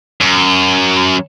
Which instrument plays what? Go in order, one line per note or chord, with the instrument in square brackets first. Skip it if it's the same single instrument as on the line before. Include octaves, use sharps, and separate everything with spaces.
[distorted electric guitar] F#2